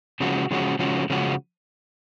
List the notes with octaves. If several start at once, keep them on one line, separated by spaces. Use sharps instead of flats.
C#3 F3 G#3 C#4 F#4
C#3 F3 G#3 C#4 F#4
C#3 F3 G#3 C#4 F#4
C#3 F3 G#3 C#4 F#4